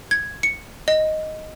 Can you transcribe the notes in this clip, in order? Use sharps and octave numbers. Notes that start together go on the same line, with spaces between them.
G#6
C#7
D#5